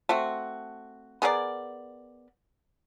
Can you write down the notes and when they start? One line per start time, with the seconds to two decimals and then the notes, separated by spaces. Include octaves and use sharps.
0.09 A3 C4 F#4
1.22 B3 G#4 A#4 D5